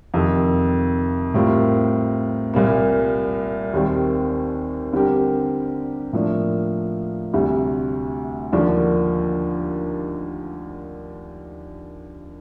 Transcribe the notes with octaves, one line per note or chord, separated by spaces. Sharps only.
F2 C3 D#3
A2 G3 C4 F4 A#4
C2 A#2 G3 A#3
D#2 D#3 G3 C4
D3 G3 C4 G4 A#4
A2 F3 A#3 D4
D2 C3 G3
D#2 D3 F3 A#3 D4